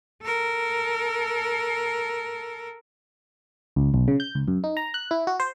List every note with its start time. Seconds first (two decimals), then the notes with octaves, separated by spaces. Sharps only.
0.22 A4 A#4
3.76 C#2
3.94 B1
4.08 C#3
4.20 G6
4.35 C#2
4.48 F#2
4.64 D#4
4.77 A#5
4.94 F#6
5.11 E4
5.27 F#4
5.40 C5